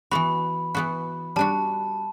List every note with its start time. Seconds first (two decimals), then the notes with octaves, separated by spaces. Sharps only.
0.11 E3 B3 F#4 B5
0.75 E3 B3 F#4
1.36 G3 D4 F#4 A5